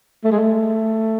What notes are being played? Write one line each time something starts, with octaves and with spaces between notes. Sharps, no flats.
A3
G#3
A3